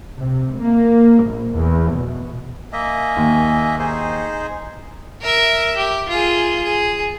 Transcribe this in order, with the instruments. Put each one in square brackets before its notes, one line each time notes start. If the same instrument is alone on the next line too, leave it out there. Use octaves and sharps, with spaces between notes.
[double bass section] C3
A#3
A#1
E2
B2
[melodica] A#3 D#5 E5 [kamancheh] G#5
[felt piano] D#2
[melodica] D#4 G#4 C5
[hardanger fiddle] A#4 E5
G4
F4 G#4
G#4